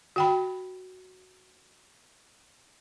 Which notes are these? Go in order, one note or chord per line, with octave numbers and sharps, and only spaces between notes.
F#4 G5 B5